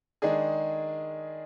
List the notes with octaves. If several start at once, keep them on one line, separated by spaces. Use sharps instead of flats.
D#3 G#3 D4 G#4